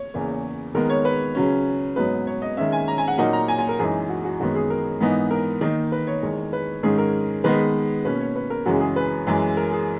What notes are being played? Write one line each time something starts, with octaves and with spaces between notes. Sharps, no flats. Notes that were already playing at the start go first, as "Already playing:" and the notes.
Already playing: C#5
E2 C#3 E3 A#3
D#3 G#3 B3 A#4
C#5
B4
C#3 F#3 C#4
G#2 F#3 B3 D#4 B4
C#5
D#5
D#3 G#3 C#4 E5
G#5
A#5
G#5
F#5
A#2 F#3 A#3 D#4 F#5
A#5
G#5
G#5
A#4
F#2 E3 G#3 D#4 G#4
F#4
F#4
F#2 D#3 G#3 B3 F#4
G#4
A#4
G#2 E3 B3 D#4
A#4
D#3 A#3 D#4
B4
C#5
E2 D#3 G#3
B4
G#2 D#3 G#3 C#4 G#4
A#4
D#3 G#3 B3 B4
B2 A#3 C#4 B4
C#5
B4
A#4
F#2 C#3 E3 G#3 C#4 F#4
G#4
B4
F#2 E3 G#3
A#4
G#4